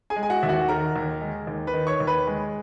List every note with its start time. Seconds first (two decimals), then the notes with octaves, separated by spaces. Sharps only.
0.10 G#4 G#5
0.16 G#3
0.23 G#5
0.30 F#4 F#5
0.43 D#2 E5
0.49 F#4 F#5
0.68 D#3 A#4 A#5
0.96 D#2
1.21 G#3
1.47 D#2
1.67 B4 B5
1.74 D#3
1.87 C#5 C#6
2.00 D#2
2.07 B4 B5
2.27 G#3